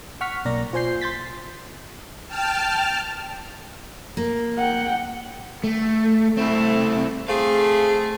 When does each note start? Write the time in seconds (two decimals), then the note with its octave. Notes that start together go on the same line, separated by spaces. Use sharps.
0.21 F#5 C#6 F6 B6
0.45 B1 A#3 A#4 D5 A#6
0.73 F4 C5 G#5 G6 C7
1.01 C6 G6 A6 B6
2.28 G5 A5 F6
4.17 A#3
4.58 F#5 G5
5.64 A3
6.37 A3 C4 E4
7.28 A3 C4 G#4 F5